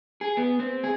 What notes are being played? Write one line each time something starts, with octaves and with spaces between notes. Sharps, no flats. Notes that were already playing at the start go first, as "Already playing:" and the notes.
G#4
B3
C4
G#4